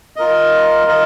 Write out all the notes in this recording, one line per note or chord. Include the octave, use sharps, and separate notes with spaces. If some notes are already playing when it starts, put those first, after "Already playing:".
F4 A#4 D#5
F4 A#4 D#5